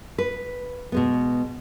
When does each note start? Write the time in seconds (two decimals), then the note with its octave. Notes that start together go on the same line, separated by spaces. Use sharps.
0.18 B4
0.92 B2 G#3 B3